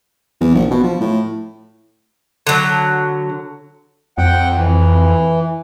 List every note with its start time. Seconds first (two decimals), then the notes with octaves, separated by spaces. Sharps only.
0.41 E2
0.55 A#1
0.71 B2
0.83 F3
1.01 A2
2.47 D3 F#3
4.18 F2 F#5 G5
4.55 E3